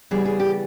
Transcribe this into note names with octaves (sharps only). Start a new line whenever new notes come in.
C#3 E3 G3 B3 G#4
G#4
G4